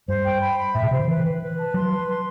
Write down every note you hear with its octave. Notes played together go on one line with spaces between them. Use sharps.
G2 C5
G5
B5
B5
A2 E5
B2
C3 C5
D3
E3 B4
B4
B4
A5
F#3 C6
B4
C6